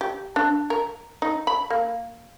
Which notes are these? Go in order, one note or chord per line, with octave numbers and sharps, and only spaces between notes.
G4
D4
A#4
D#4
B5
A#3